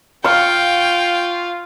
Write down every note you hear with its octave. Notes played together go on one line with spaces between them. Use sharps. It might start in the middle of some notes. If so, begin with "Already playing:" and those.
F4 F5 G5 C#6